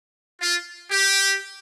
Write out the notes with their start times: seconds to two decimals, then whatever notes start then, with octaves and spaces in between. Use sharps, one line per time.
0.41 F4
0.91 G4